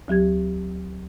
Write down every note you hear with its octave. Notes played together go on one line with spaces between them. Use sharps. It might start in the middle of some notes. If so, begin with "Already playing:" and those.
D2 F#3 G4 G#6